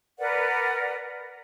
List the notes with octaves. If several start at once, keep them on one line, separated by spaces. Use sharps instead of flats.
A#4 B4 D5 F#5